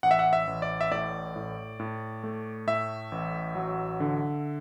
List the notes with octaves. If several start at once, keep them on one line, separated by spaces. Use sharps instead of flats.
A1 F#5
E5
F#5
E5
A1
D5
E5
A2 D5
A2
A2
A3
A2 E5
A1
F#3
D3